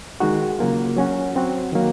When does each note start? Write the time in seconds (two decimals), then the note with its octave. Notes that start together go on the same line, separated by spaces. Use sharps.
0.20 D#3 G#3 D#4 F#4
0.59 C#3 F#3 A#3 F4
0.97 F#3 C#4 F#4
1.35 F#3 C4 F#4
1.73 D#3 F#3 A#3